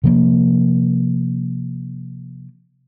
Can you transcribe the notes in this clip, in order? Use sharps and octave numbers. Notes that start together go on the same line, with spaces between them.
C3 F3 A#3